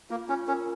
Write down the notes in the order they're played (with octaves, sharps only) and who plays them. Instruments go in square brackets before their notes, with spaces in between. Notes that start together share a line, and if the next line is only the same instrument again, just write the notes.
[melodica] A#3 [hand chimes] F4
[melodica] C#4 [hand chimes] F4
[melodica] C#4 [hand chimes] A#4